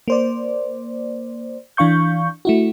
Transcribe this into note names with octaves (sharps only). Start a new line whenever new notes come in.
A#3 C5 D5
E3 D4 F5 C#6 G6
A3 E4 F#4